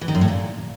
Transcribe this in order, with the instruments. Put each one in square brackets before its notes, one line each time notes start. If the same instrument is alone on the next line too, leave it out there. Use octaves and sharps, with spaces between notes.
[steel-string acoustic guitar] E3
D#3
F#2
A2
A#2